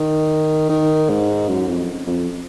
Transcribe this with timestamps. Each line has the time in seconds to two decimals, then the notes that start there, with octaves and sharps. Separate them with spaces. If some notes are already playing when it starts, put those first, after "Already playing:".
Already playing: D#3
0.70 D#3
1.09 G#2
1.48 F#2
1.68 F2
2.07 F2